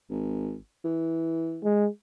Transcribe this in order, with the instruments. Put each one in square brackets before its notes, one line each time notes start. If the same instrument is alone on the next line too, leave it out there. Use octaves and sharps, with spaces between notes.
[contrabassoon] G#1
E3
[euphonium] G#3